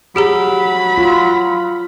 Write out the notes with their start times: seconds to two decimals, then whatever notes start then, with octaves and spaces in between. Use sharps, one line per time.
0.16 F#3 G4 G#4 A#5 B5
0.98 F4